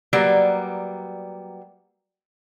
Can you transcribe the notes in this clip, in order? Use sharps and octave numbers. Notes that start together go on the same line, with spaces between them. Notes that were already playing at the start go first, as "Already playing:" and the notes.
F#3 G3 A#3 B3 D5